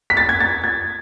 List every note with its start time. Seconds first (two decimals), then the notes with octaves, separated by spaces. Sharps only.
0.10 B6
0.17 A6
0.29 G#6
0.41 A6
0.64 G#6